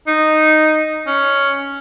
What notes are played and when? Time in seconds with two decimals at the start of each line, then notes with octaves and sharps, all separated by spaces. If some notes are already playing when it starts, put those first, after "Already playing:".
0.07 D#4
1.07 C#4